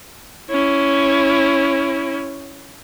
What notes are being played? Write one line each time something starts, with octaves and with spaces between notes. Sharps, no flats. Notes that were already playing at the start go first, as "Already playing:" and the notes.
C#4 E4